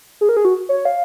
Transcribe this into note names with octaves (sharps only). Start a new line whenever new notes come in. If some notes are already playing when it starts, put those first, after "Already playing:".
G#4
A#4
G#4
F#4
C#5
F5